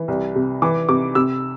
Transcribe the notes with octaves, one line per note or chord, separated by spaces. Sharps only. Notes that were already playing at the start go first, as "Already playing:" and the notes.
Already playing: E3
C2
C3
E3 D6
C3 D6
C3 E6